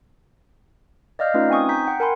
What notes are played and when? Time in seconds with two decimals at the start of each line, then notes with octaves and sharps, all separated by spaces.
1.19 D5 D#5 F5 F6 G6
1.34 A3 C#4 D#4 F4 B4
1.49 C4 D#4 G#5 C#6 D#6
1.69 A#5 G6 B6
1.87 F#5 G5
2.00 A#4 F#5 G#5 B5 C6